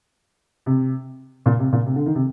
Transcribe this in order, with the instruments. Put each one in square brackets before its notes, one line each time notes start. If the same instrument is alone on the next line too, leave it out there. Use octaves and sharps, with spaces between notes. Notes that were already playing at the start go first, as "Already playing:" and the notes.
[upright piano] C3
A#2
C3
A#2
C3
D3
D#3
C3